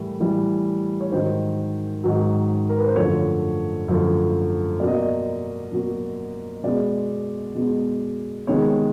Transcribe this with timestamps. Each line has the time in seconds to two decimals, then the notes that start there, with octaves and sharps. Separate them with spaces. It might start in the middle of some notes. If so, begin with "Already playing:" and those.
Already playing: A2 E3 G3 A#4
0.20 A2 E3 G3
1.01 C#5
1.12 G#2 D#3 F#3 C5
2.04 G#2 D#3 F#3
2.69 A#4
2.78 B4
2.87 C5
2.96 F#2 D3 F3 A3 C#5
3.88 F#2 D3 F3 A3
4.80 B2 F#3 A#3 D5
4.87 D#5
4.95 D5
5.72 B2 F#3 A#3
6.64 B2 G#3 B3 D5
7.55 B2 G#3 B3
8.47 C3 D#3 G#3 B3 C#5